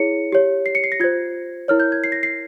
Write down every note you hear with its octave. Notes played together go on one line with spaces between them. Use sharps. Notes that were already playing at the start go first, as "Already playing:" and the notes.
Already playing: E4 G#4 C#5 C#7
G4 C#5
C7
C#7
C7
A#6
F4 C5 G#6
E4 A#4 C#5 F6
G6
G#6
C7
A#6
C7